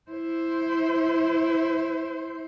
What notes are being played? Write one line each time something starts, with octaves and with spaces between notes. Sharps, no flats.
E4 C5